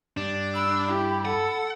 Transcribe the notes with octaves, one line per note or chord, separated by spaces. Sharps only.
G2 D4
B5 E6
E4 G4
A4 F#5